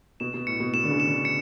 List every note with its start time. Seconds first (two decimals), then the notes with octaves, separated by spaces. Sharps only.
0.20 B2 E7
0.34 B2
0.47 A2 C#7
0.60 B2
0.74 B2 E7
0.84 D3
0.90 C#3
1.00 E7
1.07 D3
1.25 C#7